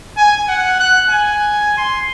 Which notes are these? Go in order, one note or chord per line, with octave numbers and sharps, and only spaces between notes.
G#5
F#5
F#6
G#5
C6